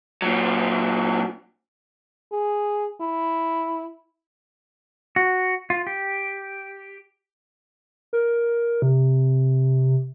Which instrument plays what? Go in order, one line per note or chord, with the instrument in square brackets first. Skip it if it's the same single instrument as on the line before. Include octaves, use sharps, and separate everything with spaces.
[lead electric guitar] A#2 F#3
[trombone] G#4
E4
[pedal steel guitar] F#4
F4
G4
[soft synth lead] A#4
C3